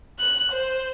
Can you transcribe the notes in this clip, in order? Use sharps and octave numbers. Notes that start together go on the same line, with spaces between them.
F#6
C5